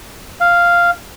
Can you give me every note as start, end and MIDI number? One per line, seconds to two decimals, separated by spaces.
0.40 0.91 77